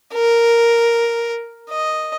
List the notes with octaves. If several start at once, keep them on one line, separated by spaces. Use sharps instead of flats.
A#4
D#5